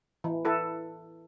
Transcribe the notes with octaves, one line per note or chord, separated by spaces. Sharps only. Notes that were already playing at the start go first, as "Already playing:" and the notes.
E3
E4 A4 B4